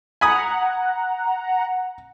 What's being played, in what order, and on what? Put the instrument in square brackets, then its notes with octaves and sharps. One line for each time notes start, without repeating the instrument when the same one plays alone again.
[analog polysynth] F#5 A#5 [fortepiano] G#5 B5 D#6